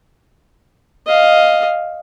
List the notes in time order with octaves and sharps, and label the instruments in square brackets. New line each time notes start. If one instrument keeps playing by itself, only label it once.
[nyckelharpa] D#5 F5